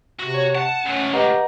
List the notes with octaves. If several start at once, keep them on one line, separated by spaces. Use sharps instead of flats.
C3 F#4
C#5
F#5 A5
C#2 A2 C#4
G4 B4 D#5 F#5 A#5